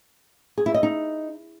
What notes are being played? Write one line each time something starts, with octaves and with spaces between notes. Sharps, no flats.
G#4
E4
D#5
D#4